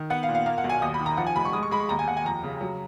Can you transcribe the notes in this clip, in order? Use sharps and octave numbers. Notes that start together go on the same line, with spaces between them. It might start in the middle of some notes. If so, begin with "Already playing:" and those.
Already playing: D#3
B3 F#5
F5
A#2
F5
A#3 F5
F#5
B1
G#5
D#2 D#6
B5
D#3
A#5
F3 F#5
G#5
F1 B5
C#6
G#3 D#6
C#6
G#3 B5
C#6
D#2 A#5
G#5
D#2 F#5
G#5
F2 A#5
C#3
F#3